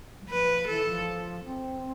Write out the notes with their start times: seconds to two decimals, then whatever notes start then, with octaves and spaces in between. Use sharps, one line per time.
0.21 G3
0.29 F3 B4
0.67 E3 A4
0.86 F3
1.44 C4